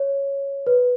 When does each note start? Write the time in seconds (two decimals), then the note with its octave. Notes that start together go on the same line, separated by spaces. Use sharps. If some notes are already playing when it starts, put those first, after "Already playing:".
Already playing: C#5
0.67 B4